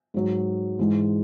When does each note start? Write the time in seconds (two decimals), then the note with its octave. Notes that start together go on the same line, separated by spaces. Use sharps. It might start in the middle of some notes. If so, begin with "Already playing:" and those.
0.14 G#2 F#3
0.79 G#2 E3 G#3